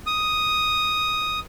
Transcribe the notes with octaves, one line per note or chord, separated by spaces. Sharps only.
D#6